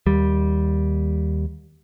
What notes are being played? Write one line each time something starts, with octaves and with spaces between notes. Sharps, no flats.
D#2 G3